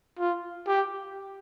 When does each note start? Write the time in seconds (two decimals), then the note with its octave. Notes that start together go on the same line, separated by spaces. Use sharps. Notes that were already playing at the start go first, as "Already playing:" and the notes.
0.19 F4
0.67 G4